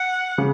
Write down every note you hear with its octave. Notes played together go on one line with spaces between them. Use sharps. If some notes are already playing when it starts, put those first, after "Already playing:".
Already playing: F#5
C#3